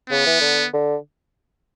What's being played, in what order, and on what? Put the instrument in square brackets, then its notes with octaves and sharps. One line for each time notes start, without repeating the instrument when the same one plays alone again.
[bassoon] C#3 [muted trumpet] B3
[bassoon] E3
D3
D3